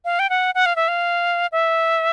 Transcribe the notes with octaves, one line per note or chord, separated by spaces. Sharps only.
F5
G5
F#5
F#5
F5
E5
F5
E5